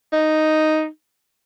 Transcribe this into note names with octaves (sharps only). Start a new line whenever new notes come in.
D#4